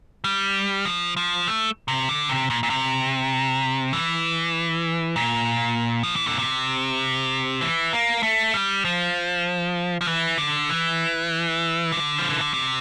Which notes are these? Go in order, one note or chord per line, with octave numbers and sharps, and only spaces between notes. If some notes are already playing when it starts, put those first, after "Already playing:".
G3
F3
F3
A3
C3
D3
C3
A#2
A#2
C3
E3
A#2
F3
E3
D3
C3
E3
A#3
A3
G3
F3
F3
E3
D3
E3
D3
F3
E3
D3
C3